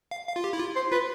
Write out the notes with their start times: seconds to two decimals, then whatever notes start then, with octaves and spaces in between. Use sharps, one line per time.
0.11 F5
0.28 F5
0.36 F4
0.44 G4
0.53 E4
0.59 F4
0.76 C5
0.92 F4 B4